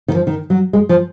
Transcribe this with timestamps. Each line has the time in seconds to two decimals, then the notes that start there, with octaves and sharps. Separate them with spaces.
0.08 D#3
0.15 F3
0.27 D#3
0.50 F#3
0.73 G#3
0.89 F3